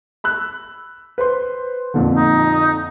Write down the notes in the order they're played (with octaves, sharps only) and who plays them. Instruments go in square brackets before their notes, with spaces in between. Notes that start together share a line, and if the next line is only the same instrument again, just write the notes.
[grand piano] B5 E6 F#6
B4 C5 C6
F2 A#2 D3
[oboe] D#4